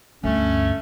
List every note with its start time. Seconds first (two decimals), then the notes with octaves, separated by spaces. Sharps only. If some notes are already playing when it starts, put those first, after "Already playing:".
0.23 D2 G2 A3 C#4